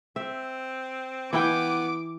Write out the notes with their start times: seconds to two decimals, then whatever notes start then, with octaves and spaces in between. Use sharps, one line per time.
0.16 C4 E5
1.33 E3 B3 E4 G5 D6